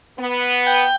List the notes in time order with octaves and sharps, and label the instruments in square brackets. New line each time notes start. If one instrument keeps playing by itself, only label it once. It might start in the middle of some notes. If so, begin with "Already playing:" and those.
[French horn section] B3
[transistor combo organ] G5